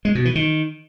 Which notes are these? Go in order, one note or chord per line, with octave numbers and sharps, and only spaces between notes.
G#3
B2
E3
D#3